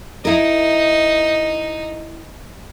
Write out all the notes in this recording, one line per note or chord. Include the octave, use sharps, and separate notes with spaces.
D#4 E4 A#4